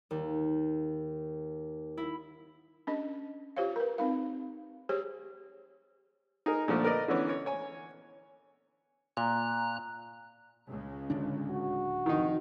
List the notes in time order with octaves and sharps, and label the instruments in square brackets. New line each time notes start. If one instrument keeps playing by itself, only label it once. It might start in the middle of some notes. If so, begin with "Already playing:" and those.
[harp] D#2
E4
[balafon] C#4 D4 D#5
F4 G4 C5 C#5 F5
A#4 B4
C4 D#4 F5
G4 G#4 C5 C#5
[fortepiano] D#4 G#4 A#4
A#2 D3 F3 A3
A#4 B4 D5 D#5
D3 E3 B3 C#4
C#5
C#5 G#5
[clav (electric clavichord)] A#2 [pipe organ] A#5 F#6
[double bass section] C#2 C#3 G#3
[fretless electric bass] D1 D3 D4
[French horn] F#4
[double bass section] C2 F2 [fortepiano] D#3 D#4